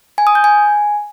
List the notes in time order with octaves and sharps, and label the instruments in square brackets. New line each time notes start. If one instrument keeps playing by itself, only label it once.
[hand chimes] G#5
D#6
G6
G#5